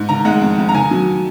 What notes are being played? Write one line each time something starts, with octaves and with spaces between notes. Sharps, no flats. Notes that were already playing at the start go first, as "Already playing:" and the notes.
Already playing: G#2
D#3 A#5
G#3 F#5
F2
F2
A#5
D#3 G#5
F#3